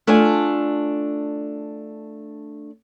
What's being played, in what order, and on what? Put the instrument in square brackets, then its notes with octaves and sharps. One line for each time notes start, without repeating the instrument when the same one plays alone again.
[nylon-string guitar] A3 D4 F4 D5 G#5